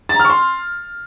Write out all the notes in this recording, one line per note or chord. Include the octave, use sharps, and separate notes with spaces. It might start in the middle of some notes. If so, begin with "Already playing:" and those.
A6
A#5
F6
C#6
C6